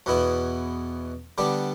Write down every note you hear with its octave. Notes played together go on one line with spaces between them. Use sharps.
E2 B2 B3 E4
D3 G3 B3 D4